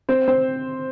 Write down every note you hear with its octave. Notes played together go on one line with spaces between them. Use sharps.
C4 C5
C4 C5